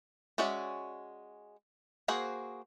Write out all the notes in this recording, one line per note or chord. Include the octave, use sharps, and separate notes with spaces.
G#3 C#4 F#4 D5 E5
A#3 F#4 G#4 C5